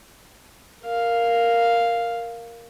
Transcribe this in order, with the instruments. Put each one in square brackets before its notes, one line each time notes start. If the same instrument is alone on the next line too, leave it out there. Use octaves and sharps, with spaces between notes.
[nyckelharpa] A#4 F5